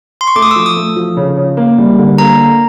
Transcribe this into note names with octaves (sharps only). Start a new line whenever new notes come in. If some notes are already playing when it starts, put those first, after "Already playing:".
C6
C#6
A3 D6
D#6
F3 E6
D#6
A3
F3
C#3
C#3
A#3
G3
D3
A#3 A#5
A#3